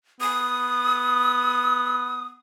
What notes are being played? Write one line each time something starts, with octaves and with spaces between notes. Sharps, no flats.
B3 D#6